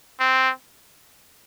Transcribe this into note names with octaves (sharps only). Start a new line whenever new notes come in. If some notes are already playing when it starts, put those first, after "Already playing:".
C4